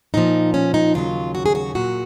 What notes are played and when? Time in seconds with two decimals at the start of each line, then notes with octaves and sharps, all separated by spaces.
0.14 A#2 F3 D#4
0.54 C#4
0.74 D#4
0.94 D#2 C#3 F#3 F4
1.35 F#4
1.46 G#4
1.55 F#4
1.75 A#2 F#3 F#4